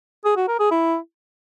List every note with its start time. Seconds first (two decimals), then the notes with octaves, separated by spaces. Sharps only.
0.25 G#4
0.36 F#4
0.48 A#4
0.60 G#4
0.71 E4